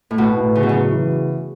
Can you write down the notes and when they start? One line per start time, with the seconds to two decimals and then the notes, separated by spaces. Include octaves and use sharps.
0.11 A2
0.18 B2 B3
0.37 A2
0.55 C#3 E4
0.63 B2
0.69 C#3 F#3
0.92 E3